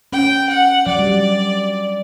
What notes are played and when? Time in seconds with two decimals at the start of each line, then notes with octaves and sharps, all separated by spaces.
0.12 C#4 G5
0.49 F#5
0.87 F#3 D5
0.99 G3